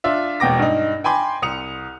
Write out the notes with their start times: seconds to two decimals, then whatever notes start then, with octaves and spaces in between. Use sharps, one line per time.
0.04 D4 F4 E5
0.40 E1 B2 G5 D6 A#6
0.59 G2 D#4
1.04 G5 G#5 B5 C6 D6
1.42 C2 D#6 C#7 F7